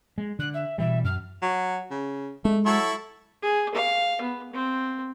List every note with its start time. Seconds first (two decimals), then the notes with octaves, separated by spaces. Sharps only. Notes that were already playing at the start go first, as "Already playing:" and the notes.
0.18 G#3
0.39 D3 F#6
0.53 E5
0.78 B2 E3 G3 E5
1.04 F#2 F6
1.42 F#3
1.91 C#3
2.45 G#3 A3
2.66 F#3 E4 A4 C#6
3.42 G#4
3.74 F5
4.21 B3
4.52 C4